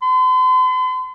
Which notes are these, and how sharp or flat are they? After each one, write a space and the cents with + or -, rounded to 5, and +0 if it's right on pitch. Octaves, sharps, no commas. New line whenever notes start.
C6 -45